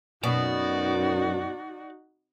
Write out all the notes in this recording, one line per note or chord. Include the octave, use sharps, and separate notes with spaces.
F#2 B2 D#4 F#4 D5